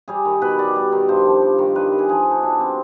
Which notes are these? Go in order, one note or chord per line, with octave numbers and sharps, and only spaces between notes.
G3 G#4
D#3
B2 B4
G3 D5
G3
D#3
G2 C5
F3
G3
D#3
G3 B4
D#3
G#4
F3 G#4
D3
D#4
B2 D4
G3 C4